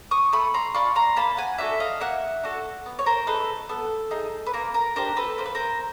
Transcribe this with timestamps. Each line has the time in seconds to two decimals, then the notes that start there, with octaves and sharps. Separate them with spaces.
0.11 C#6 D#6
0.32 A3 B5 C#6
0.54 A#5 C6
0.74 D4 F4 B5 C#6
0.96 A#5 C6
1.16 A#3 A5 B5
1.37 F#5 G#5
1.58 D4 F#4 A4 E5 F#5
1.80 D#5 F5
2.00 A#3 E5 F#5
2.43 D4 F#4 A4
2.86 B3
2.99 C#5
3.06 A#4 C5
3.27 D#4 G#4 A4 B4
3.69 B3 A4
4.11 D#4 G#4
4.46 B4
4.53 A#3 A#4
4.74 A#4
4.96 D4 G4 A#4 C5
5.17 A4 B4
5.38 A#3 C5
5.46 B4
5.55 A#4 C5